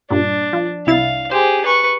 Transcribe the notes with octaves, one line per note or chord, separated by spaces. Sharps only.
G2 A#2 D4
F3
C2 E4 F5 A6
G4 G#4 C5
B4 C#6